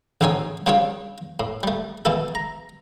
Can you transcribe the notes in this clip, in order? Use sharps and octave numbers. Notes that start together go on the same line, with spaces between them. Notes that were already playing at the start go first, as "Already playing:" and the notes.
A1 D3 C4 D#4 C#5 G#5
C#3 G3 C4 D4 F4 C#5
A2
G3 A3
B2 E3 E4 A4
A#5